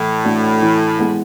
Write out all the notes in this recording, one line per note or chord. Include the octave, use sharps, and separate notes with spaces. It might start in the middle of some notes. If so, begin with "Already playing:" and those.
Already playing: A2 E3
A3 D4 F#4
E3
G#3 B3 E4